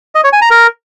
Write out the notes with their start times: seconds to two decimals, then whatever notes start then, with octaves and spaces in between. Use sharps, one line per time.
0.15 D#5
0.24 C#5
0.33 G#5
0.42 A#5
0.51 A#4